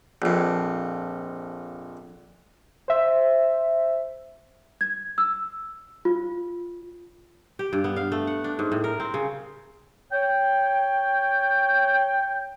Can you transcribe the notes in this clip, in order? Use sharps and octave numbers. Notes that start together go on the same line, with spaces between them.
A#1 F2
C5 E5
G#6
E6
F4
G4
G2
B3
F5
A3
F#5
D4
G#2
A2
A#4
C4
C#3
C#5 G5